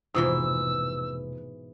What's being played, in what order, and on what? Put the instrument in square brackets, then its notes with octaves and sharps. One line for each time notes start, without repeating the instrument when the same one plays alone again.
[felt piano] F1 F4 D#6 [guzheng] G#2 B2 E3 [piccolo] E6